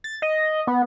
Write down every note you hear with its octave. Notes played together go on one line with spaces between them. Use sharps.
A6
D#5
B3